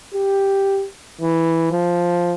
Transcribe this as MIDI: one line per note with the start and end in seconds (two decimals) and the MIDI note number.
0.14 0.85 67
1.21 1.67 52
1.71 2.35 53